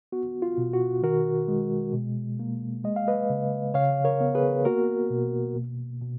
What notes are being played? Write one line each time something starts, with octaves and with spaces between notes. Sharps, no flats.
B3 F#4
F4
B2
F#4
D#3 F#4 A#4
G#3
B2
A#3
G#3 D#5
F5
B4 D#5
C#3
C#3 C#5 F5
A#4 C#5
B3
G#4 B4
A#3 F#4 A#4
B2
B2
B2